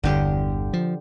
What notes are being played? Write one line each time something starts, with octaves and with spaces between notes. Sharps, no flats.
G1 E2 D3 G4
F3